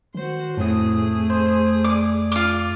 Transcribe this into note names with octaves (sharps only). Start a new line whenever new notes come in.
D#3 F#4 C5
F2 A2 A3 C4 G#4 D#6
C5
D5 D6
F4 D6